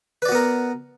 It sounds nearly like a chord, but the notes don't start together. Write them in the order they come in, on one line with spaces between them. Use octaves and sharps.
B4 D5 F#4 B3 A#4